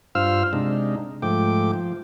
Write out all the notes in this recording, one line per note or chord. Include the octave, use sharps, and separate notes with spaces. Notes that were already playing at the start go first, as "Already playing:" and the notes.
G2 F4 C5 F5 E6 F6
C3 G#3 D4 D#4
G#2 F3 A3 G5 D6
F3